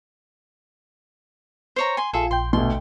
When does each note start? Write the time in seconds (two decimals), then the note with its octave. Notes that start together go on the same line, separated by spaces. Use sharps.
1.76 C5 C#5 A#5
1.97 G#5 C6
2.13 A#1 F4 G#4 A4 E5
2.31 A#1 G5 C6
2.53 D2 B2 C6